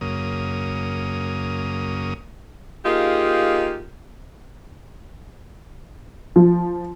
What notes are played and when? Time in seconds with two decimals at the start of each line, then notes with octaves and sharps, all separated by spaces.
0.01 F#2 C#3 A#3 D#6
2.85 A#3 D#4 F4 G4 G#4
6.36 F3